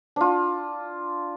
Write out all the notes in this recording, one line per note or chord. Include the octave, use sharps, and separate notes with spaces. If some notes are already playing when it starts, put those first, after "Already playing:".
D4 F4